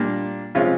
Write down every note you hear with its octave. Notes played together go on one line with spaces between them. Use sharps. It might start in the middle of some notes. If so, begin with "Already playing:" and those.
Already playing: A#2 G3 A#3 D4
C3 F3 G#3 C#4 F4